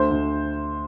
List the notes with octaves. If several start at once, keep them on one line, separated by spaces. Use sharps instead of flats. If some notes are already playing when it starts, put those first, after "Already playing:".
Already playing: D2 C5
D2